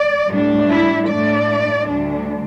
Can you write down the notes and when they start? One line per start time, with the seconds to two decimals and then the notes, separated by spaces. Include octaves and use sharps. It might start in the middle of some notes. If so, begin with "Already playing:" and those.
Already playing: D5
0.30 A2 G3 D4
0.69 E4
1.08 A2 A3 D4 D5
1.86 D2 D3 G3 D4